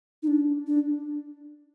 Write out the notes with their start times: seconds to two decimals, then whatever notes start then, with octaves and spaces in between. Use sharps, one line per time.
0.23 D#4
0.27 D4
0.67 D4